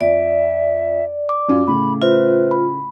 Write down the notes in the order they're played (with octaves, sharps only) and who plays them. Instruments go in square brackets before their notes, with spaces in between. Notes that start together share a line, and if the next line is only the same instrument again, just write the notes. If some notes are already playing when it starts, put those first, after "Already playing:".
[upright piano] F2 [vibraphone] D5 [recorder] E5
[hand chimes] D6
[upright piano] F#2 C#4 F4
[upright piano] A2 C#3 [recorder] B5
[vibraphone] F4 [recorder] B4 [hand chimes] C5 E5
[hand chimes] B5